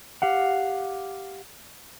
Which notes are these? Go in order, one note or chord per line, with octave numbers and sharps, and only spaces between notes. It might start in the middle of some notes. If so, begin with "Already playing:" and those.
G4 F5 F#5